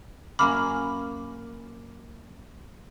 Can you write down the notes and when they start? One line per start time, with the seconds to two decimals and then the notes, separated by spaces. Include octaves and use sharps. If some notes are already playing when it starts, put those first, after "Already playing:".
0.39 F#2 A#3 C#4 B5 D6 F6